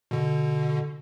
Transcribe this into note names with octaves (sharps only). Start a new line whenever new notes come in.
B2 D3